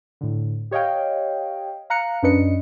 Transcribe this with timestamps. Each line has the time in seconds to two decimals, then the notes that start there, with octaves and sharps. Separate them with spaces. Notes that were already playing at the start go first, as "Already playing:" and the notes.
0.21 A2 D3
0.71 G4 C#5 D#5 F5 G5
1.90 F5 A#5 F#6 C#7
2.23 F#2 C#4 D4 B4 D#5 C#7